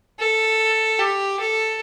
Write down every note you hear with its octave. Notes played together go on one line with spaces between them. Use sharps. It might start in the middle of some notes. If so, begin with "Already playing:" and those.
A4
G4
A4